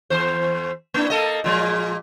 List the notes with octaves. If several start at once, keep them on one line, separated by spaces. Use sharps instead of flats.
E2 C5
A#3 D4 E4
A#3 A4 D#5
A#2 F3 G#3